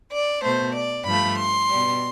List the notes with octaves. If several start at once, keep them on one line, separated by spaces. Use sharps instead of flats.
D5
B2 A3 C5
D5
G2 F3 A3 B5
C6
B2 G3